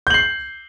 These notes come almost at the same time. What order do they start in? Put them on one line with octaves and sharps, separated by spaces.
G6 F#7 C7